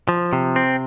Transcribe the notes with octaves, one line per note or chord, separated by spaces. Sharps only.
F3
C3
C4